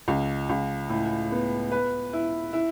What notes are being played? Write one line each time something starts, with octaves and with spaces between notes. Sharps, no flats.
C#2
C#2
A2
B3
B4
E4
E4